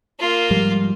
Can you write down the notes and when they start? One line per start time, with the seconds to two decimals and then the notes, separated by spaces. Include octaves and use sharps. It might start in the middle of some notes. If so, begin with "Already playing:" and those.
0.20 A#3 F4
0.50 G#2 F3 G3